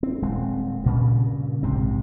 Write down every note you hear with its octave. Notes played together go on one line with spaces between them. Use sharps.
C4
D#1 G#3 C4
G2 A#2 C#3
A#1 G#2 C3 C4